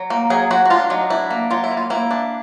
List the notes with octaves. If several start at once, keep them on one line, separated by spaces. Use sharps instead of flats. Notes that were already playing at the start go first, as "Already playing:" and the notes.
Already playing: F#3
A#3
F#3 G#4
F#3 F#4
F#4
D4 F4
F#3 D#4
D4 E4
A#3
F#3 F4
E4
A#3
F4
A#3 E4
D4